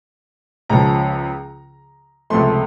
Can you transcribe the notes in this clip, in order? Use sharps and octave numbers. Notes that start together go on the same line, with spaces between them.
C#2 C#3 F3 A#5
C#2 C3 F3 A3 C6